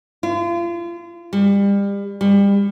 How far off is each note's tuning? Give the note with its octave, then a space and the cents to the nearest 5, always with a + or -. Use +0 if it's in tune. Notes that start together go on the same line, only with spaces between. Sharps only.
F4 -35
G3 +30
G3 +30